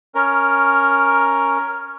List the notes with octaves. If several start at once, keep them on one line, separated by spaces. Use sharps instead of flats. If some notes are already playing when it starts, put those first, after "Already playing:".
C#4 A#4